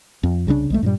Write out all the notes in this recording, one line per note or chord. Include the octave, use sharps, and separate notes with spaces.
F2
C2 C#3 F#3 D4
B1 G#3 A3
G2 A#2 G3